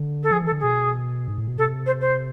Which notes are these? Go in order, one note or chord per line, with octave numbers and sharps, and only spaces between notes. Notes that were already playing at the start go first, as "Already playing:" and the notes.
Already playing: D3
A4
F3 G#4
E3 A4
D3
B2 G#4
G#2
A2
B2
C3 A4
C5
C5